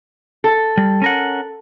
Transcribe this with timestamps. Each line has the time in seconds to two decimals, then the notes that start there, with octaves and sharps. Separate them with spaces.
0.44 A4
0.77 G3
1.02 C#4 A#4 F#5